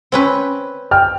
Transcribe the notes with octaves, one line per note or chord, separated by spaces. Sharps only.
C4 C#4 B4
G5 F6